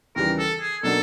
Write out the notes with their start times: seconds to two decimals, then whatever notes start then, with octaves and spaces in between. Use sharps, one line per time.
0.16 D#2 C#3 E3 G3 A#4
0.38 A4
0.61 G#4
0.83 B2 F#3 A#3 D4 F#4 A4